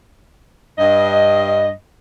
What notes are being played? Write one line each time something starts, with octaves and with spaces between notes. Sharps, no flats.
G2 D#5